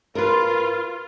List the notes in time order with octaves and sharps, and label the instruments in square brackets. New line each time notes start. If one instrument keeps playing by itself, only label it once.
[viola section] F4 [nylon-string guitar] A#4 B4